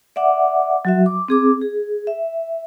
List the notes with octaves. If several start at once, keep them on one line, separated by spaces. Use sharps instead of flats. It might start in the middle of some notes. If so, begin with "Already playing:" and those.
D5 E5 F#5 D6
F#3 F#4 E5
D6
C4 G#4 D6
G#4
E5